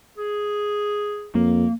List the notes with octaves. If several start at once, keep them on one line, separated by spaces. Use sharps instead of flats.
G#4
F2 A#3